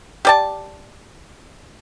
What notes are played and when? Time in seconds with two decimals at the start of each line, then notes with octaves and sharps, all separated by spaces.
0.25 G4 D5 A5